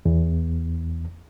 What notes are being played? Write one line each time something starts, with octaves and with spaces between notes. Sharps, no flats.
E2